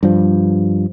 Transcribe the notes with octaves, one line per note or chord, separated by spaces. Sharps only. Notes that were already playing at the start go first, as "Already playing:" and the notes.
G2 F3